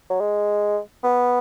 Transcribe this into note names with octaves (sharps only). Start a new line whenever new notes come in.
F#3
G#3
B3